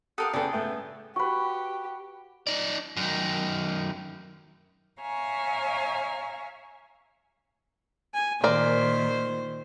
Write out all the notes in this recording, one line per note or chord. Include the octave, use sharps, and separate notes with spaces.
G4 A4 A#4 F5 F#5 D#6
C#3 B3 G#4 A4 D5 G5
A2 A3 B3
F#4 G4 B4 C#6
D#4 D5
F#2 D#3
C#5 E5 F5 G#5 A#5 C#6
G#5
A#2 D#3 A#4 C5 D5